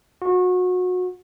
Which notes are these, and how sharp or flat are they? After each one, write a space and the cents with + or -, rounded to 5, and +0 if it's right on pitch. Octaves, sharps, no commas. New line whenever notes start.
F#4 -30